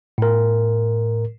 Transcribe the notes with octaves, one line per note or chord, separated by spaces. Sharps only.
A2 A#4